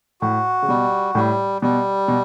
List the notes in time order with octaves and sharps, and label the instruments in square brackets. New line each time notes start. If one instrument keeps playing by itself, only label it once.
[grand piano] A2 [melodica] F#4
[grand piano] C#3
[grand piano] B2 [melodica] G3
[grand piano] A2 [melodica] G3
[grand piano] B2 [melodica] G3
[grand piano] B2